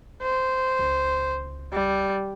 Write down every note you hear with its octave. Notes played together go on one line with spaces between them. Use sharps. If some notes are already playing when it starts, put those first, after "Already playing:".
C5
C#2
G3